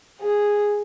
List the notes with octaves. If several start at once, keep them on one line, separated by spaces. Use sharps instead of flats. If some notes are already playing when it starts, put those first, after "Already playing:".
G#4